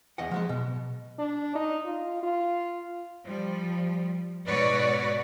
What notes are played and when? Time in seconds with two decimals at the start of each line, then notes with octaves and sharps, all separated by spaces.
0.18 E2 D#5 F#5
0.31 F3 F#3 G#3
0.49 B2
1.19 D4
1.55 D#4
1.85 F4
2.23 F4
3.25 F3 G3
4.47 G#2 B2 F#4 B4 C#5 D5